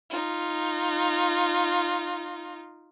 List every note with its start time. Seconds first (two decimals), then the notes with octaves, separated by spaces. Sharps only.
0.10 D#4 F4